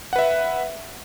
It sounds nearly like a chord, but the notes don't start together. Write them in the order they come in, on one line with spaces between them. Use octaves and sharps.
F#5 B4 E5